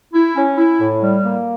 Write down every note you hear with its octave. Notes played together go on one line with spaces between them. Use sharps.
E4
C#4
E4
A2
G3
A#3